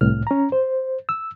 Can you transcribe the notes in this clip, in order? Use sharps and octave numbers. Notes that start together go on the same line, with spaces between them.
C2 A2 F6
C#4 A#5
C5
E6